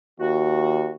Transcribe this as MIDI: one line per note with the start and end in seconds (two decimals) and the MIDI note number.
0.20 0.95 39
0.20 0.92 66